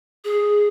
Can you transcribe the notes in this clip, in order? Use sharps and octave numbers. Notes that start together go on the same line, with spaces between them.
G#4